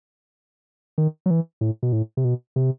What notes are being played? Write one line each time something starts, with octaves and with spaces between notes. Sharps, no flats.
D#3
F#3
E3
A2
B2
A2
C3
B2
C3